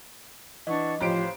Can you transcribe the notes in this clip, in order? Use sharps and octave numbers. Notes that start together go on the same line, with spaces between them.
E3 D4 D#5 F#5 C#6
A1 F3 G4 C5 F5 D7